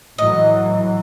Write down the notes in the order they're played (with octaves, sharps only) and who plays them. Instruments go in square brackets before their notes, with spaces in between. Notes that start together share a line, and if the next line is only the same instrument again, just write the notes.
[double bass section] A2 E3 F#3 [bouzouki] D#5